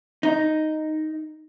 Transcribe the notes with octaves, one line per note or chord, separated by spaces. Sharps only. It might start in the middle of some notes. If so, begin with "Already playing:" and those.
D#4